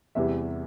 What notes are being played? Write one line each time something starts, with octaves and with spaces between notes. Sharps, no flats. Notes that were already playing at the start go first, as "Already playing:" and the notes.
E2 C3 E3 G3 E5